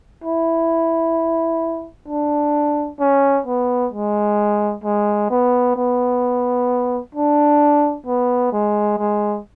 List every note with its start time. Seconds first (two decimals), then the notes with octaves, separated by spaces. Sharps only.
0.24 E4
2.08 D4
3.00 C#4
3.46 B3
3.93 G#3
4.84 G#3
5.30 B3
5.76 B3
7.15 D4
8.06 B3
8.52 G#3
8.98 G#3